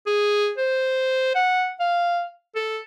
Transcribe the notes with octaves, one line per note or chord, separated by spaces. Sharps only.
G#4
C5
F#5
F5
A4